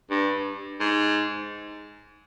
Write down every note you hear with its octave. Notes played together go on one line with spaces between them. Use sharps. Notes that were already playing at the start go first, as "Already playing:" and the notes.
G2
G#2